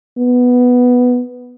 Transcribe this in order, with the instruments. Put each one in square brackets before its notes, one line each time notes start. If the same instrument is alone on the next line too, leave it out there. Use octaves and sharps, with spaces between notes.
[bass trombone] B3